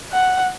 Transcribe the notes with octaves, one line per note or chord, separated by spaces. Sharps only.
F#5